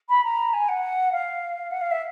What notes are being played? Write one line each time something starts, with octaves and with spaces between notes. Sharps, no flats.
B5
A#5
G#5
F#5
F5
F#5
F5
E5